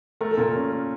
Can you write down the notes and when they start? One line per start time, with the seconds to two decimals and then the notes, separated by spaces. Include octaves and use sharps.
0.21 A3 A#4
0.31 A4
0.37 A#2 A#4
0.55 C#4 A4
0.71 C#4